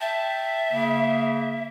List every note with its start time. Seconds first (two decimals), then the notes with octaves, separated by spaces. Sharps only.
0.01 E5 G5 A5
0.72 C#3 A#3